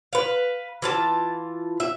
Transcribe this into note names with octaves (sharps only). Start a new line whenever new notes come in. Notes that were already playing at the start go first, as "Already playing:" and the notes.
B4 F5
E3 F4 A5
E5